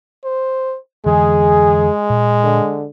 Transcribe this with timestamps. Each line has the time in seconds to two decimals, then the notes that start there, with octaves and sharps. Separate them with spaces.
0.24 C5
1.06 F2 D3 E3 G#3 G#4
2.10 A#2
2.43 D3